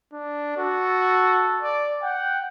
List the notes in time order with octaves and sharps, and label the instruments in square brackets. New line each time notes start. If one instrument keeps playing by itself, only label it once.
[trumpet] D4
[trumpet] F#4 [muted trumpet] A4
[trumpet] D5
[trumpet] F#5 [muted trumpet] G5